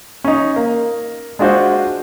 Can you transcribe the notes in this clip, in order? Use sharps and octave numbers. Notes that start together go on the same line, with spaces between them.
C#4 D#4
A#3
G#3 D4 F4 F#4 C5 D#5